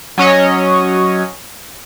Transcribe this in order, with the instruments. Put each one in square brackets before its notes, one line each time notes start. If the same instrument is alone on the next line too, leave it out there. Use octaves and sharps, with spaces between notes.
[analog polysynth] F#3 C#4 C#5 D#5